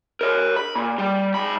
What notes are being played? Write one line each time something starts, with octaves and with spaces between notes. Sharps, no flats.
A#4 C#5
B5
A#2
G3
G#2 B5